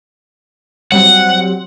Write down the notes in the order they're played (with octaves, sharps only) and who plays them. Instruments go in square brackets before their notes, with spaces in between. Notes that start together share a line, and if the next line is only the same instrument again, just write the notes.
[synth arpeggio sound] F#3 G3 C4 [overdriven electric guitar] F#5